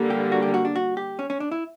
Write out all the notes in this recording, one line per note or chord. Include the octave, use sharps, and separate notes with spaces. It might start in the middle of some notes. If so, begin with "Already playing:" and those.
Already playing: D3 G3 A#3
G4
F#4
G4
F#4
D4
F#4
G4
C#4
C#4
D4
E4